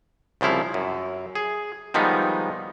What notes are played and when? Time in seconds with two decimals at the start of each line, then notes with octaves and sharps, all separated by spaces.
0.41 C2 C#3 F3 E4 F5
0.74 F#2
1.35 G#4
1.94 D#3 F3 G3 G#3 B3 D#4